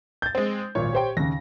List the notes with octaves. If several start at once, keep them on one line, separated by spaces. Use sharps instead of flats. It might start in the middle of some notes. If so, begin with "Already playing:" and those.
G6 A6
G#3 C4
G#1 A#2 C#5
G4 C5 G5
D#2 C#3 A#6